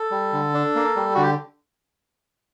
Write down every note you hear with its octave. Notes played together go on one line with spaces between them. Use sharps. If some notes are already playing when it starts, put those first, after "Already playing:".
Already playing: A4
G3
D3
D4
A#3
G3
D3 F#4
G4